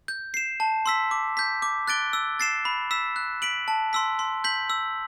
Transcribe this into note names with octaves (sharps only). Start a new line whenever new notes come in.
G6
C7 E7
A5
C6 E6 B6
D6
G6 B6
D6
F#6 A6 D7 G7
E6
A6 C7 E7
B5
E6 B6 E7
F#6
B6 D7 F#7
A5
C6 E6 B6
C6
G6 B6 F#7
E6